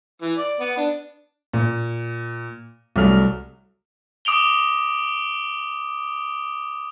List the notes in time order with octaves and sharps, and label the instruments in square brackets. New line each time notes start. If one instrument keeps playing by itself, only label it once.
[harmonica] E3
D5
B3
D4
[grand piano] A#2
C2 F#3 A3 F6 F7
[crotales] D6 D#6 D7 F7 G7